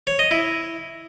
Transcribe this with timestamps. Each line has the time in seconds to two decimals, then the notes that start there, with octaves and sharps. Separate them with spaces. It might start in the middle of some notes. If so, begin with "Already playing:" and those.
0.07 C#5
0.19 D#5
0.31 E4